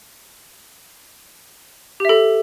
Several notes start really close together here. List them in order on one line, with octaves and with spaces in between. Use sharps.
G4 E5 A4